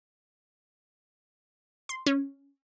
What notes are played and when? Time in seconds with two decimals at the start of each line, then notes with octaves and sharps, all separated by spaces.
1.89 C6
2.06 C#4